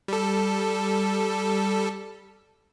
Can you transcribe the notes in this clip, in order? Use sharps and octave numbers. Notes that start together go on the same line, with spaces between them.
G3 A4